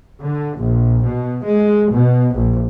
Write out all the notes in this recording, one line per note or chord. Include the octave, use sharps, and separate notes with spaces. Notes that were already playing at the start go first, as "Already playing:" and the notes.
D3
A#1
B2
G#3
B2
A#1